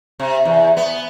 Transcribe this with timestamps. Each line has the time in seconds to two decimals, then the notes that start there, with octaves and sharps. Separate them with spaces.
0.20 C3
0.45 E2
0.77 B3